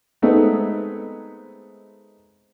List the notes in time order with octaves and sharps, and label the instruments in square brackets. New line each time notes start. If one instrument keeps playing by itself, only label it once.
[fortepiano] G#3 A3 B3 C4 D#4